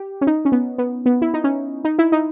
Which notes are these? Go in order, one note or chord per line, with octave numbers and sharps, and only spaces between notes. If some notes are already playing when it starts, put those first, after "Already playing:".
Already playing: G4
C#4
D#4
C#4
B3
B3
B3
E4
D#4
C#4
D#4
E4
D#4